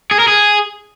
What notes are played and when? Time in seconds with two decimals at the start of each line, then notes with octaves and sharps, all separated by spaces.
0.11 G#4
0.19 A#4
0.28 G#4